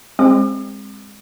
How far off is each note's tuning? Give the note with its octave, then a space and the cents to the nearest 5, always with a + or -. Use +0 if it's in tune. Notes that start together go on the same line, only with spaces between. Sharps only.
G#3 -25 C4 +15 D6 +40